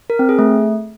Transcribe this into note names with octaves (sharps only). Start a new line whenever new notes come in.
A#4
C4
G#4
A3